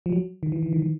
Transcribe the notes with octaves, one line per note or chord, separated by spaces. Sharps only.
F3
F#3
D#3
E3
E3
D#3
E3